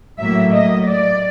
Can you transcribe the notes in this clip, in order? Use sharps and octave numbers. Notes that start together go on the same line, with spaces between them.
A2 F#3 A#3 E5
D#5
D5